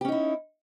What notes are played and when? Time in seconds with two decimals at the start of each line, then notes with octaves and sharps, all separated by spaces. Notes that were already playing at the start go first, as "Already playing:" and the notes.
0.01 G4
0.05 C#4
0.08 D#4
0.12 E4